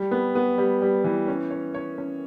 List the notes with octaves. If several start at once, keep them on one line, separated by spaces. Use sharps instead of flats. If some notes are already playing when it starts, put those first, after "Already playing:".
Already playing: G3
B3
B3
G3
G3
E3
C#4
C#5
C#5
C#4